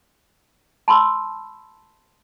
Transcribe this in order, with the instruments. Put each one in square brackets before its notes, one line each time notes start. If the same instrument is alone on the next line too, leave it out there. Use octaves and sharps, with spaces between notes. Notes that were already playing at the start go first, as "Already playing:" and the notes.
[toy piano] A5 B5 C6 E6